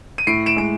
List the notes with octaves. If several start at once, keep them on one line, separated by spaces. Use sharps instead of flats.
D#7
A2 C7 D7
D7 E7
G#3 D7